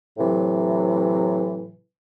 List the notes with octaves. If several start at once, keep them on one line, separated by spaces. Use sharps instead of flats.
A2 C3 E3 F#3